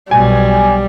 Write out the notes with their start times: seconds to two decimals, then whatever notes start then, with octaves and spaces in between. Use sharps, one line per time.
0.11 B1 B2 G3 G#5